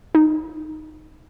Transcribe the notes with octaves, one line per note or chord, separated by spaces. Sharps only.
D#4